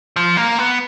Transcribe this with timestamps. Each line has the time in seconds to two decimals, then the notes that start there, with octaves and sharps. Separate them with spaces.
0.16 F3
0.37 A#3
0.58 B3